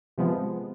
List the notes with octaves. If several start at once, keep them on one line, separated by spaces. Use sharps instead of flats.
C3 F3 G#3 B3